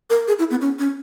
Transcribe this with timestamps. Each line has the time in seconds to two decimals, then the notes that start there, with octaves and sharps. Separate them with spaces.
0.10 A#4
0.28 G#4
0.39 E4
0.51 B3
0.61 C#4
0.79 C#4